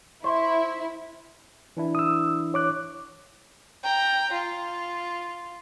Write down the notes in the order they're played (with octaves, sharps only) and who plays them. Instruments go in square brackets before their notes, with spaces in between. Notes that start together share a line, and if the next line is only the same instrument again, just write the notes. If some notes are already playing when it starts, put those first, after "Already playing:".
[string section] E4 [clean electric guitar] C5 [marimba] E5 C#6
[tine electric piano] E3 D4 E4
[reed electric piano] D#6 E6
C#5 D6 F#6
[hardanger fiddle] G5 A#5
F4